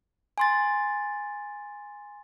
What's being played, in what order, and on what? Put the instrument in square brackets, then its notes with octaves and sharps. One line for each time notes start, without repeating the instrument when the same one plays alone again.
[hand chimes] G#5 C6 A6